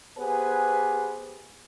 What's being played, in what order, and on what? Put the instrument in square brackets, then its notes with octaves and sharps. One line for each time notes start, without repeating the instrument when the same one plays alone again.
[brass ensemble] B3 G4 G#4 B4 C5 G#5